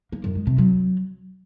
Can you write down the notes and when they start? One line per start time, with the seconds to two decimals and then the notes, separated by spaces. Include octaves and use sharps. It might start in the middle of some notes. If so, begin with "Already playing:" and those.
0.12 A#3
0.24 F#2
0.35 G#3
0.47 C3
0.58 F#3